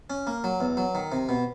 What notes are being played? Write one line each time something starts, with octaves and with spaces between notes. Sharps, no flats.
C#4
A#3
F#3
E2
F#3
D#3
C3
B2